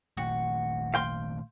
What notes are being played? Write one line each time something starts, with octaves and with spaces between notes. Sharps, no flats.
A#2 D#3 A3 F#4
F5 G5 C6